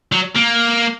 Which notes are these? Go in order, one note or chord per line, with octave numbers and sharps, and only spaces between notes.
F#3
A#3